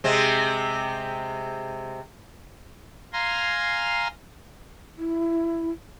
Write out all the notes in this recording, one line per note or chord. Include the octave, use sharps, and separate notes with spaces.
C3 G#3 C4
F5 G#5 A#5 C6
E4